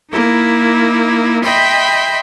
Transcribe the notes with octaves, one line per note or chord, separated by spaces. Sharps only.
A#3 D#4 E4
D#5 E5 G5 B5 C6